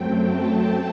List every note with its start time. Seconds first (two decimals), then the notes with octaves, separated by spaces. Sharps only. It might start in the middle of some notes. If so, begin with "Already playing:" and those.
Already playing: F#2 F#3 A3 C4 G5
0.17 A5
0.62 A3